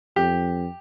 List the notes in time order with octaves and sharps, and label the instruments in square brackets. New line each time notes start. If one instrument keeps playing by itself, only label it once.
[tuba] F2 [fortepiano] G4